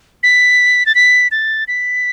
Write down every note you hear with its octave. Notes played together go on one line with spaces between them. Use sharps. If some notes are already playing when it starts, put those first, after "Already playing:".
B6
A6
B6
A6
B6